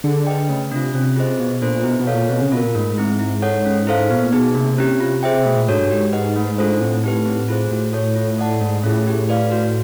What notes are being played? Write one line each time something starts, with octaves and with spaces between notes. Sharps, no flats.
D3 G#4
B4 D#5 G5
C#3 A3
C3 D4 F4
C3 C#4
F4 G#4 C5 D#5
B2 B3
A#2 D4 F4 A4 C5
B2 E4
B2
A4 C#5 F5
A#2
B2 C4
C#3
B2 F4 A#4
A#2
G#2 A3
C4 E4
E4
A4 C#5 F#5
C#4
E4 A4 C5 F5
A#2 B3
B2 D#4 G#4
C3 A#3
C#4 E4 G4
F4
G#4 C5 E5 G5
B2 A3
A#2
G#2 D4 F#4 A4 C#5
G2
G#2 G4
B4 D#5 F#5
A3
D4 F4 A4 C5
A2 C4
D#4 G4 B4
C4
F4 G#4 C5
A2 F#4
A4 C#5
F4
A4 D5 F#5 A5
G#2 A3
A2 C#4 F4 G#4
G4
B4 D5 F5
F#4